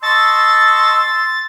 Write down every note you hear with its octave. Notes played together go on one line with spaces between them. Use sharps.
D#5 A5 C6 C#6 E6 A6